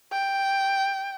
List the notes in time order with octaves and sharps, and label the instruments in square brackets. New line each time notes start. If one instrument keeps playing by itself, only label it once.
[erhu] G5